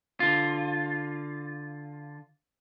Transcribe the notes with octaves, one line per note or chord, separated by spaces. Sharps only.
D3 F4